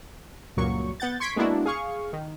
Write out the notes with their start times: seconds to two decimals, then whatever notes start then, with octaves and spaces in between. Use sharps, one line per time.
0.57 C#2 G2 A#2 F#3 A#3 C#6
1.00 B3 F#5 G6 A6
1.20 C6 C#6 G#6 B6 D7
1.36 G#3 A#3 B3 D4 E4 F#4
1.66 G#4 F5 C#6
2.13 D#3